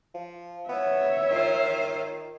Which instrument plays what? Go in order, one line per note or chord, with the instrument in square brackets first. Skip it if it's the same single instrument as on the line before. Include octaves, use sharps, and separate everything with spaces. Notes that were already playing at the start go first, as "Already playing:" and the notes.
[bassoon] F3
[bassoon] B3 [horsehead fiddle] C#5 E5
[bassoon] D#3 [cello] F4 C5